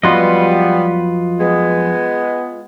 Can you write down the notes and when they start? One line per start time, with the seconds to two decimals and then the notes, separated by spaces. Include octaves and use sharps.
0.03 F2 F#3 G3 B3 F4 B4 D#5 C6
1.39 G#3 B3